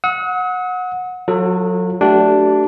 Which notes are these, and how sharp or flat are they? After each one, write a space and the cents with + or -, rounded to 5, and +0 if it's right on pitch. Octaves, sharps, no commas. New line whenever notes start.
F#5 -20 D#6 +45
F#3 -25 F4 +0 A4 +20
A3 +0 D4 +0 G4 -35